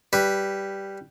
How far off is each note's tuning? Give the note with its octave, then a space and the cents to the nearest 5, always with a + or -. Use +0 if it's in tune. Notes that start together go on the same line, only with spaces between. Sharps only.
G3 +0 B4 +0